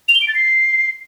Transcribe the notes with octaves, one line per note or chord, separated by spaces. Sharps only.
F7
G7
D7
A6
C7